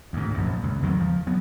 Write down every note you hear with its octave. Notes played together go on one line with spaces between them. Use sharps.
D2 G#2
A#1 F#2
C#2
E2 D#3 F#3
F3
F#3 B3